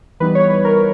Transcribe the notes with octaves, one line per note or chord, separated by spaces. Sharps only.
E3 G3 B3 D#4 B4
C#5
B4
A#4